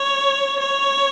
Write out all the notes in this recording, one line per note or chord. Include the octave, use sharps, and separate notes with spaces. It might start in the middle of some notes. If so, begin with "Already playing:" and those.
Already playing: C#5
C#5